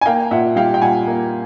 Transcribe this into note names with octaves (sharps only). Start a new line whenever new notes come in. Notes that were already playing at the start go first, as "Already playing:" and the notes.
G#5
A#3 F5 G5
A#2 E5 F#5
G3 F5 G5
G5
A#2 F#5 G#5
A#3